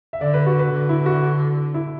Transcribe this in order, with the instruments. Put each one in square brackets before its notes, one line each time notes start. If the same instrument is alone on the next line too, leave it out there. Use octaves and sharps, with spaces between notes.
[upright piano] E5
[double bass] D3 [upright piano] D5
[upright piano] B4
F#4
B4
[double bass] D3
[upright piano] E4
F#4
E4